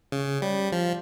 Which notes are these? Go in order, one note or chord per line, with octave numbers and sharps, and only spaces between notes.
C#3
G3
F3